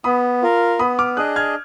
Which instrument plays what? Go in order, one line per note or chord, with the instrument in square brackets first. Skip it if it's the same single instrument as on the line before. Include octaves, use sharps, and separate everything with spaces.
[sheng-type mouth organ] B3 [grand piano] B5 D#6
[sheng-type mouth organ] F4 A#4
[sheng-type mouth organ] B3 [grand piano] B5 D#6
[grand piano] D6 F6
[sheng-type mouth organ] D4 G#4 D#5 [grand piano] D#6 F#6
[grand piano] F6 G#6